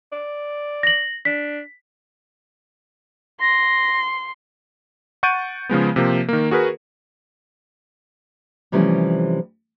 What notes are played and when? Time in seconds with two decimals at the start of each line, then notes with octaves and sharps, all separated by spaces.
0.12 D5
0.83 A#6 F#7
1.25 D4 B6
3.41 C6 A#6
5.23 F#5 C#6 G6 A6 D7 D#7
5.69 C#3 F3 G#3 B3
5.96 C3 F3 A#3
6.29 D#3 A#3
6.51 F#4 G#4 A#4 B4
8.72 C3 E3 F3 G3 A3 C#4